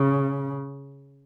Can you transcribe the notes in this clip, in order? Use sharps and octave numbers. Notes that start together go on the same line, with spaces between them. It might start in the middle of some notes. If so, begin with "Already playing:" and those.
Already playing: C#3